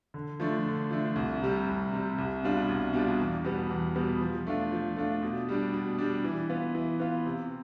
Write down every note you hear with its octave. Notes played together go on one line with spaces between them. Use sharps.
D3
F3 A3 D4
D3
F3 A3 D4
C2
C3 G3
C2
C3 G3
C2
B2 G3 D4 F4
C2
B2 G3 D4 F4
E2
B2 G3 B3
E2
B2 G3 B3
F3
A3 D4 F4
F3
A3 D4 F4
B2
G3 D4
B2
G3 D4
E3
B3 F4
E3
B3 F4
C3